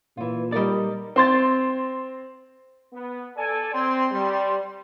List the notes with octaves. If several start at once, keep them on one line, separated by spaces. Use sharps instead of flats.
A#2 E3 F4
G3 D#4 A#4 D5 D#5
C4 C6 A6
B3
A4 D5 G#5
C4 C6
G3